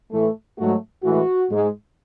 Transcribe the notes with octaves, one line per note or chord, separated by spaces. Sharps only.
A2 E3 A3
G#2 F#3 A3 F#4
A2 E3 G#3 F#4
G#2 G#3